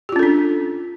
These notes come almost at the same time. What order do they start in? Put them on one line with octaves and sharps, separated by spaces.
G4 F4 C#4 A4 D4